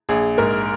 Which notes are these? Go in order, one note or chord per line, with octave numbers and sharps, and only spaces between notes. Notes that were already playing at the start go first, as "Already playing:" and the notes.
A#1 G#4
G#2 A#4